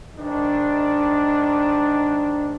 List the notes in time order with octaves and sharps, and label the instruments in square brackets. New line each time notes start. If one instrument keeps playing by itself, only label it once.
[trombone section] G#2 D#3 D4